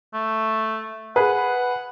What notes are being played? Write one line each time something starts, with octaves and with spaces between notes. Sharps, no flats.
A3
G#4 B4 F#5